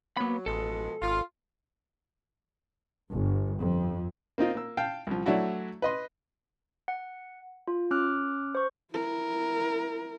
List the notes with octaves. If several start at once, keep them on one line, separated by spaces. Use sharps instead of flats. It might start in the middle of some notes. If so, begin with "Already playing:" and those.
F#3 A#3 B3 B5
A1 B2 F3 G#3 A4
G#1 F4
G1
F2
A#3 C4 D#4 F4
A#3 E6
F5 G5 A5
C2 F3
F#3 A3 D4 E4 F#4
B4 D#5 C6
F#5
F4
C#4 D6 F6 F#6
C5 C#6
E4 A#4